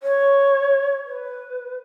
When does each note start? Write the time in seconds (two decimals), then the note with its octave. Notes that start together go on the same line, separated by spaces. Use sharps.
0.03 C#5
1.06 B4